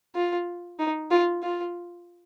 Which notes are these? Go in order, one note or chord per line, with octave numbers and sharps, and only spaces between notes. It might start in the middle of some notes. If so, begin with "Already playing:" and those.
F4
D#4
F4
F4